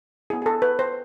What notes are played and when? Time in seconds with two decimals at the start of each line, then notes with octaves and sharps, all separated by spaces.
0.30 B3 E4 G#4
0.42 G#4
0.46 A4
0.62 B4
0.79 C5